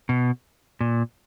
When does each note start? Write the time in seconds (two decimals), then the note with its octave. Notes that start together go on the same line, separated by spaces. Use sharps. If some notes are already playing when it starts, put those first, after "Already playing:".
0.09 B2
0.81 A#2